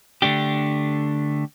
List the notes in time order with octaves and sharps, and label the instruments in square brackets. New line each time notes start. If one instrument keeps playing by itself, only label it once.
[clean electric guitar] D3 A3 D4 G4